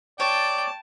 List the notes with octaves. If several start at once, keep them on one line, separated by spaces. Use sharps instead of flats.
C#5 D5 G5 A5